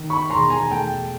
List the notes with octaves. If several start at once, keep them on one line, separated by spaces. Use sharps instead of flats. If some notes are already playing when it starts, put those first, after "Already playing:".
Already playing: D#3
B5 C#6
E1 A#5 C6
G#5 A#5
A3 G5 A5